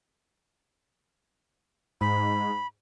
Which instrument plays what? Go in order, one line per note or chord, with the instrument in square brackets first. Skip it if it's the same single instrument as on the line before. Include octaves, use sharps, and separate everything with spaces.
[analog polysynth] G#2 [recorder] B5